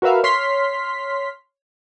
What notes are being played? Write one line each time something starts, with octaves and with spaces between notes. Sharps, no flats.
F#4 A#4 B4 E5 F5
C#5 C6 F6 B6